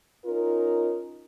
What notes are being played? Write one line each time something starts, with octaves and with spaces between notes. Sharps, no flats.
C#4 D#4 F4 A#4